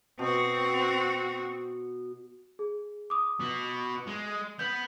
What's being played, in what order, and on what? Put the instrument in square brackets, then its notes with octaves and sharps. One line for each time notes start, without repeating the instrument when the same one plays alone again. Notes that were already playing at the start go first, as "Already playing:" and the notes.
[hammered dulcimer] B2 C6 [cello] C4 F#4
[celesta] G#4
D6 D#6
[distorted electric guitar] B3 F#4
G#3
[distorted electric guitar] B3 [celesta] G6